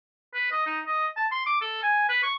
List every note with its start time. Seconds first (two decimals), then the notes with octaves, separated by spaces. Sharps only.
0.34 B4
0.52 D#5
0.66 D#4
0.87 D#5
1.17 A5
1.32 C6
1.46 D6
1.61 A4
1.83 G#5
2.09 B4
2.23 C#6